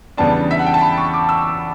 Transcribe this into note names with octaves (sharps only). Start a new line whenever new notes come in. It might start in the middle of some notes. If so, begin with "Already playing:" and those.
E2 C#3 G3 B3 D4 A5
E5
F#5
G5
A5
B5
C#6
D6
E6